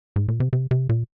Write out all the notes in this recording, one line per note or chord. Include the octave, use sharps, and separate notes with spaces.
G#2
A#2
C3
C3
C3
A#2